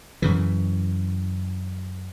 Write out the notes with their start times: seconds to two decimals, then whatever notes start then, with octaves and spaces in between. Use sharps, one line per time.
0.22 F#2 C#3 E3